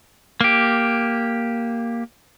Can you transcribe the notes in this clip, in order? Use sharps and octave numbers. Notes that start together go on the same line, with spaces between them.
A#3 G4